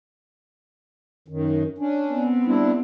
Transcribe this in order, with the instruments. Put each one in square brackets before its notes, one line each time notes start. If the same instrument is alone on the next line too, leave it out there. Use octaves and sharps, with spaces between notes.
[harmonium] F#2 D#3
C#4 D4
[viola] B3 C4
[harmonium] G3 D4 E4